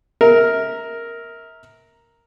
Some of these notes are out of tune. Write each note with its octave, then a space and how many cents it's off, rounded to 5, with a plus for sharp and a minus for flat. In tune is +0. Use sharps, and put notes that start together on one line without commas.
A#4 +0 E5 -35